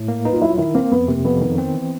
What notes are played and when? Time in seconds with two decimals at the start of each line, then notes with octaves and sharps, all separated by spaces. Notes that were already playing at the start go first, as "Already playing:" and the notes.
Already playing: A2
0.08 A#3
0.25 D#4 B4
0.33 F4
0.42 F#3 E4
0.50 F4
0.58 D#3 E4
0.75 A#3 C4
0.91 F2 B3
1.08 C3 A#3
1.25 F2 B3
1.41 D#3 B3
1.58 C4
1.75 E3